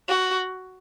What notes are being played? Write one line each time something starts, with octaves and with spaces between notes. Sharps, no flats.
F#4